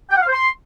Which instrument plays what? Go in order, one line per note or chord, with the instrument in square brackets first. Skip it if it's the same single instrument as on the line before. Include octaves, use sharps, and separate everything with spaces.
[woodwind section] G5
F#5
F5
C5
C6